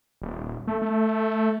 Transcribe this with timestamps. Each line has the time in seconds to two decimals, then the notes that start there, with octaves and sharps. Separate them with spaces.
0.22 D#1
0.67 A3
0.82 A3